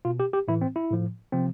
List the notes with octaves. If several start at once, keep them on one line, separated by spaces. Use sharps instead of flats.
B2 F4
G4
G4
A2 E3 E4
C4
E4
A2 F3
C3 F3 C4